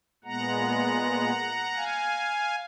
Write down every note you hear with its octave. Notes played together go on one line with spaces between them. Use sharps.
A#2 G#3 B3 F#5 A#5
F5 G#5